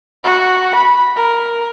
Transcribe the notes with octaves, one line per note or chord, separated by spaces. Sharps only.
F#4
B5
A#4